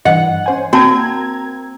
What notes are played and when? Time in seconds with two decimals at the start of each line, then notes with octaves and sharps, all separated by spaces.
0.05 G2 E3 D#5 F#5
0.46 C#4 C5 G#5
0.73 A#3 C4 F#4 A5 A#5 G#6